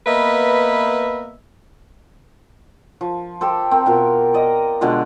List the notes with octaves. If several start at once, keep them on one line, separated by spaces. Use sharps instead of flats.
A#3 B3 B4 D#5 E5
F3
G4 A4 C5
C4 A#4
B2 F4 A#4
D5 D#5 A#5
B2 D3 G#3 F4